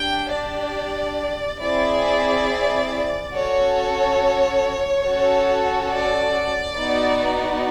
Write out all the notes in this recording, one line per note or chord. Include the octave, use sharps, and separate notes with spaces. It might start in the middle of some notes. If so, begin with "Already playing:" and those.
Already playing: D4 G4 G5
D5
C4 E4 G#4 D5
C#4 F#4 A4 C#5
C#4 F#4 A4
D5
B3 D#4 F#4